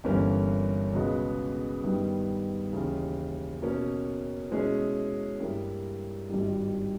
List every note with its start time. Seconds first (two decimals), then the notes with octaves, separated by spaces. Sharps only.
0.04 G1 G2 E3 A#3 C#4
0.93 C#2 B2 G#3 B3
1.83 G2 D#3 G3 B3
2.72 D#2 C#3 E3
3.62 B2 A#3 C#4
4.51 B2 G#3 C#4 E4 G#4
5.40 G2 G3 A#3 E4
6.30 G#1 G2 D#3 G3